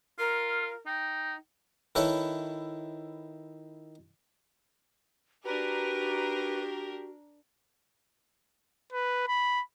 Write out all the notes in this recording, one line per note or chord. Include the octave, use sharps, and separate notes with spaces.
F4 A#4
D#4 G5
D#3 E4 A4 B4 C#5
D4 F#4 G4 A#4 B4
B4
B5